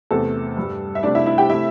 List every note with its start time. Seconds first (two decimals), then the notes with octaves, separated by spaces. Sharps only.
0.11 E2 C3 A3 A4
0.57 G2 G3
0.95 E5
1.03 C3 A3 D4 D5
1.15 E4 E5
1.26 E4 E5
1.38 G4 G5
1.49 C3 A3 E4 E5